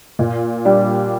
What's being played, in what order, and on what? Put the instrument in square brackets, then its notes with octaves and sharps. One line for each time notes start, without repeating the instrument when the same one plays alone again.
[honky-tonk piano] A#2
G3 D4 G4